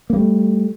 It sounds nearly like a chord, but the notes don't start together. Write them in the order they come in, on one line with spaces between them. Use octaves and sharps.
A#3 G3 A3